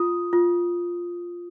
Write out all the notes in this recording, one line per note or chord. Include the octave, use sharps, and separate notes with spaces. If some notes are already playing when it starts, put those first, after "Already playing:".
Already playing: F4 D#6
F4